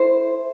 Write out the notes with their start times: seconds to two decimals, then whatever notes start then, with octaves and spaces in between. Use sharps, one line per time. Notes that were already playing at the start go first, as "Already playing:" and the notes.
Already playing: E4 A4 C5 E5